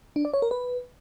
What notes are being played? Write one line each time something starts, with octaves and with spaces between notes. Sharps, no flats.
D4
D5
C#5
A#4
B4